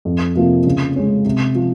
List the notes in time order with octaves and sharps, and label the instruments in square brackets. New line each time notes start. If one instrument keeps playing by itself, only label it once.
[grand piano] F2
C3 F3 A#3 F4
C#3
G#3 C#4
C3
F3